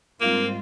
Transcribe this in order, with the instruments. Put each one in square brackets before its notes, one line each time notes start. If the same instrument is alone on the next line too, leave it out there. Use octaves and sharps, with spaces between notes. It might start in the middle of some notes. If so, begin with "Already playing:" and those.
[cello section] G#2 G3 C4 F4 [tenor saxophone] A#3